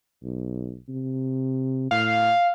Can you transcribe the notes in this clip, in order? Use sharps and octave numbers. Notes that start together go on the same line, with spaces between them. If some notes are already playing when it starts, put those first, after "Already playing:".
B1
C3
A2 F5